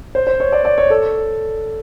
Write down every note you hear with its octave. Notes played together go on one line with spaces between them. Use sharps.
C5
C5
C#5
D5
D5
C#5
A4